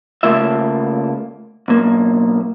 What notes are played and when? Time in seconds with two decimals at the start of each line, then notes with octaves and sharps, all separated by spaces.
0.23 C#3 A3 A#3 F4 E5
1.68 B1 A#3